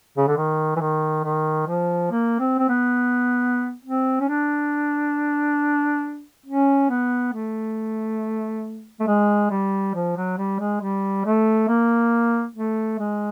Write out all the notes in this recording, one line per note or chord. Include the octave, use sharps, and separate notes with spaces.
C#3
D3
D#3
E3
D#3
D#3
F3
A#3
C4
C4
B3
C4
C#4
D4
C#4
B3
A3
A3
G#3
G3
F3
F#3
G3
G#3
G3
A3
A#3
A3
G#3